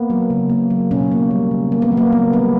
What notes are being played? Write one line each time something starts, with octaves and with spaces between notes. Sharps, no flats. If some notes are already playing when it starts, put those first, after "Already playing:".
Already playing: A#3 B3
F#3
C#3
A#3
F#3
B2 C#4
A#3
G3
C#3
A#3
B3
F#3
A#3
C#3 B3
G3 B3